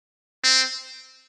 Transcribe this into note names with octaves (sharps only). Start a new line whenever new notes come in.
C4